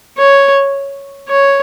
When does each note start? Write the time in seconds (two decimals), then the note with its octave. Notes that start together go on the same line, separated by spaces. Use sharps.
0.18 C#5
1.29 C#5